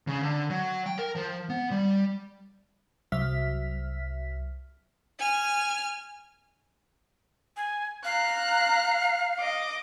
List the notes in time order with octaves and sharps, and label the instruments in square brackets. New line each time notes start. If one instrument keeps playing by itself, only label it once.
[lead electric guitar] C#3
D3
F#3
G5
A#4
F3
B3
G3
[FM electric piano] C2 F#3 E5 F6 B6
[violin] G#5 F6
[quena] G#5
[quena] F5 [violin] A#5 F#6
[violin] D#5 D6